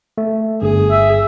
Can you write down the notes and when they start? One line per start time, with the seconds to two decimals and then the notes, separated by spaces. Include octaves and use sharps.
0.18 A3
0.62 G1 G2 G#4
0.91 E5